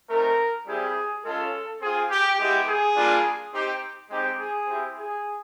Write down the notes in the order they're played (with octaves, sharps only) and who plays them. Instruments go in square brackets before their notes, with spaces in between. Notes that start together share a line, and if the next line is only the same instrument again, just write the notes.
[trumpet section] A3 C4 D#4 A#4
G3 C4 E4 G4 G#4
G#3 C#4 F4 A4
C4 F4 G#4
G4
G#3 B3 E4 G4
G#4
G3 A#3 D4 F4
C4 D#4 G4
G#3 C4 D#4 G4
G#4
C4 E4 G4
G#4